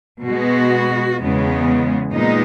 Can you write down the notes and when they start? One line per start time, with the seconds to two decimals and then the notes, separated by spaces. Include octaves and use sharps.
0.25 B2 G#3 B3 F#4
1.19 E2 C#3 G#3 B3
2.13 A#2 G#3 B3 D#4